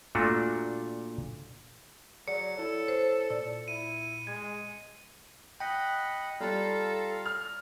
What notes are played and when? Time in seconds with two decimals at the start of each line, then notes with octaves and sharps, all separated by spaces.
0.15 A#2 A3 D4 F4 F#4
2.28 F#3 G#4 D5 F#5 C#7
2.57 E4 A4 C#5
2.88 C5
3.30 A#2 D5
3.68 E4 D#7
4.27 G#3 G#6
5.60 D#5 F#5 G5 B5
6.40 G3 F4 A4 F5 A#5
7.25 F6